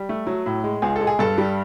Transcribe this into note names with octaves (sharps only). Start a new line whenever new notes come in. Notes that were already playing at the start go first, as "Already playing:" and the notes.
Already playing: G3
A3
F#3
A2
G#3
C#2 G#4
A4
G#3
G#4
G2 A4
G3